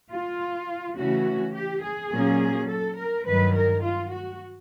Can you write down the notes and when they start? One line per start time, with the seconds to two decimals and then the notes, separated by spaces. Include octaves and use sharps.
0.12 F4
0.98 C#3 E3 A3 C#4 F#4
1.56 G4
1.84 G#4
2.13 A#2 F#3 A#3 C#4
2.70 A4
2.99 A#4
3.27 G2 D#3 F#3 B4
3.56 A#4
3.85 F4
4.13 F#4